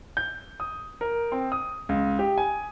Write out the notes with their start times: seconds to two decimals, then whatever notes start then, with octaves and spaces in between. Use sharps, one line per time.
0.17 G6
0.60 D#6
1.01 A#4
1.32 C4
1.52 D#6
1.89 C#2
2.19 G4
2.38 G#5